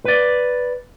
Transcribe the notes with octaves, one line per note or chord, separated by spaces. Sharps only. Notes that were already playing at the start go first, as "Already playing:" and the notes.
B4 D5